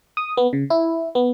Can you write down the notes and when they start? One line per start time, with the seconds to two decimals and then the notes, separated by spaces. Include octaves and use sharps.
0.17 D#6
0.37 B3
0.53 C#3
0.70 E4
1.15 B3